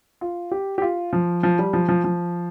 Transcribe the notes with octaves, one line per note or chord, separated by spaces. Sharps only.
F4
G4
G4
F4
F3
F3
G3
F3
F3
F3